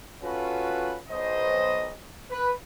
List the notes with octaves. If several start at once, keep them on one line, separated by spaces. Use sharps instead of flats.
C#4 F4 F#4 A4 B4
B1 C5 D#5
B4